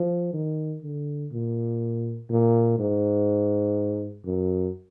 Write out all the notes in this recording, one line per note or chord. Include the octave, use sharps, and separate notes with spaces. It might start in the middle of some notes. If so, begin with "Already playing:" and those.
Already playing: F3
D#3
D3
A#2
A#2
G#2
F#2